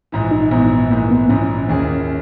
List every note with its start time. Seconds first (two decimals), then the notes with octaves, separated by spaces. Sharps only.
0.12 A#1 G#2 E3
0.31 D#4
0.51 A#1 G#2 E3 B3
0.90 A#1 G#2 E3 A#3
1.11 B3
1.29 A#1 G#2 E3 C#4
1.69 D#2 D#3 A#3 C#4 E4 G#4